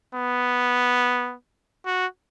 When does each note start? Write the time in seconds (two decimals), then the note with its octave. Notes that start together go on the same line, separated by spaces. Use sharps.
0.15 B3
1.86 F#4